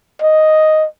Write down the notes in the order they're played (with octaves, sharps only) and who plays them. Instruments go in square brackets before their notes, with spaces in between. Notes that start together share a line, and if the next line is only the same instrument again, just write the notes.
[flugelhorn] D#5